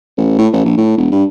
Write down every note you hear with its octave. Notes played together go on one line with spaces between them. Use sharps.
A1
A2
A1
A#1
A2
E1
G2